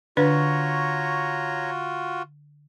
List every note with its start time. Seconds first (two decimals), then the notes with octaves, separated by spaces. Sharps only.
0.17 D3 D4 F4 F#4 B4 C#5 A#5